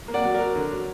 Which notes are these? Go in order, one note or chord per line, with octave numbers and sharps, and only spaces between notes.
A#3
D5 F#5
F#3
A#4 D5
F#3
D3
F#3